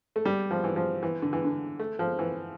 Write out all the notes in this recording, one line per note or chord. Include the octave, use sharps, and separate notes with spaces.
A3
G3
F3
E3
F3
E3
D3
E3
D3
A3
F3
E3